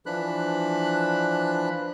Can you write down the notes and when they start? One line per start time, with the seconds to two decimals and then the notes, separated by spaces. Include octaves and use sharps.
0.06 E3 F3 D4 B5 F#6